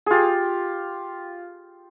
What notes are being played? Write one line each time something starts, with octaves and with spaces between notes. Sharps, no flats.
F4 G4 G#4